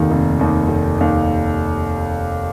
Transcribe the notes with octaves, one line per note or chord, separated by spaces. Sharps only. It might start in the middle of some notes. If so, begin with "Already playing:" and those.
Already playing: F1 D#2 D#3
F1
D#2 D#3
F1
D#2 D#3